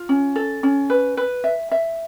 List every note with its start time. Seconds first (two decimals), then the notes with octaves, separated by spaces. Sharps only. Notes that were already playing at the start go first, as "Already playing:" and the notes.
Already playing: F4
0.09 C#4
0.36 A4
0.63 C#4
0.90 B4
1.17 B4
1.44 E5
1.72 E5